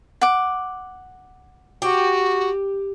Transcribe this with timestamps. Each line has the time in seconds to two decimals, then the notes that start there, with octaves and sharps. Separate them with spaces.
0.21 F#5 D6
1.82 F#4 G4